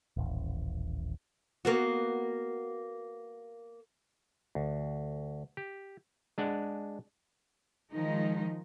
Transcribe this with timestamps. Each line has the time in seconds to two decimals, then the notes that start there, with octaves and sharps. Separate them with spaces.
0.17 D#1 A1
1.65 A#3 B3 F#4
4.55 D2
5.57 G4
6.38 G#3 D4 F#5
7.92 D#3 F3 G#3 D#4